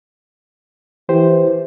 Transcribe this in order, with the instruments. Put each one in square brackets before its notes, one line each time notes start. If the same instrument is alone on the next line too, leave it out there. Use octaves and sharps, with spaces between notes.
[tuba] E3 [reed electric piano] G4 C5